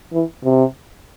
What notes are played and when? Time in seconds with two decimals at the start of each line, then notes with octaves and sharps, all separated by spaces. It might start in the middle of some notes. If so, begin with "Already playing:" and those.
0.12 E3
0.44 C3